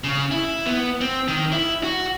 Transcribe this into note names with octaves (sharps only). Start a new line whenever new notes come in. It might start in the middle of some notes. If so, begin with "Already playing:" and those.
C#3
E4
B3
C4
D#3
E4
F#4